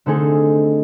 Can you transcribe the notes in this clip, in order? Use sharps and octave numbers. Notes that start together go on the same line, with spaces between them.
D3 A3 C4 D#4 G#4 A4